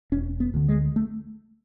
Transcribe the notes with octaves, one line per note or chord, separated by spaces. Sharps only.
E1 C#4
B3
D2 D3
G#3
A3